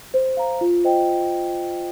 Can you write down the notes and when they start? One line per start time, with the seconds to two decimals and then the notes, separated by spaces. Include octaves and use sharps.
0.14 C5
0.37 F5 A#5
0.61 F4
0.84 C5 D#5 G5